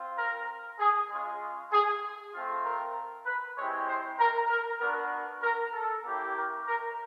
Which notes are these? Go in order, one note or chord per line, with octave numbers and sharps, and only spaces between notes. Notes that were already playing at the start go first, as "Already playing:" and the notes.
Already playing: C4 F4
A#4
G#4
G#3 C#4 F4
G#4
A3 C4 F4
A#4
B4
G#3 C4 E4 G4 C#5
C5
A#4
A#4
B3 D4 F#4 A#4
A#4
A4
A#3 C#4 E4 G4
A#4
A#4